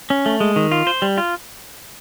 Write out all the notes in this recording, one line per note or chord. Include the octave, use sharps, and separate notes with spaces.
C#4
A3
G#3
D#3
F4
C5
G3
F4